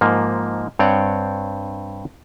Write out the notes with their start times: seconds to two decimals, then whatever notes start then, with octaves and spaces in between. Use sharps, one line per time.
0.01 G#2 F3 A#3
0.79 G2 C4 C#5 D5 F#5 G5